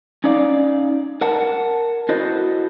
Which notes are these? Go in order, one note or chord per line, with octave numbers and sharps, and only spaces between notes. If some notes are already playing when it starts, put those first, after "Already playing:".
C#4 D#4 D5 F5
A#4 F#5 A5
E4 F#4 A4 C5 D#5